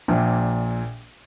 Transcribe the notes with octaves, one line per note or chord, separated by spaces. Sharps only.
A#1 A#2